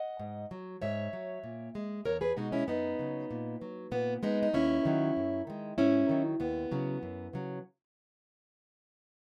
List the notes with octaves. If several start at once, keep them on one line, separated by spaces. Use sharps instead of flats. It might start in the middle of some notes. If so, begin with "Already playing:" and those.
Already playing: D#5 F#5
G#2
F#3
G#2 C#5 E5
F#3
A#2
G#3
E2 A#4 C#5
G#4 B4
B2 G#3 D#4 F#4
C#4 E4
F#2 B3 D#4
C#3 F#3
A#2
F#3
A#2 B3
G#3 B3 D#4
D#4
D#2 C#4 E4
D#3 F#3
F#2
D#3 G#3
G#2 C#4 E4
D#3 F#3
D#2 B3
C#3 F#3
F#2
C#3 F#3